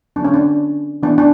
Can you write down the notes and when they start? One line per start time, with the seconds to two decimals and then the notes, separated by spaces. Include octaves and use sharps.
0.16 D3 F#3 B3 D4
0.24 C#4
0.34 D4
1.03 E3 B3 D4
1.18 D4